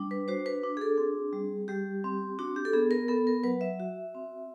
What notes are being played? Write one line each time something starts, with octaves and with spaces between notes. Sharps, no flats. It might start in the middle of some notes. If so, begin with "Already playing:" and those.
Already playing: G3 D4
B4
F#4 C5
B4
D4
G#4
A4
C4 G#4
G3
G3 G4
C4
D4 F#4
G4
A4
B3 G#4
A#4
B3 A4
A#4
F#3 B4
E5
F#4
C4